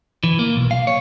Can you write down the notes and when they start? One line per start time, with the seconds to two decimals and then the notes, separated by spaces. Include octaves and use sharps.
0.24 E3
0.39 A#3
0.56 B1
0.71 F5
0.87 C#5